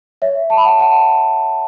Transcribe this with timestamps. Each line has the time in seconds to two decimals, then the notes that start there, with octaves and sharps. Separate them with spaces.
0.22 C#5 E5
0.50 A5
0.57 B5
0.65 F#5 A5
0.80 F#5 A5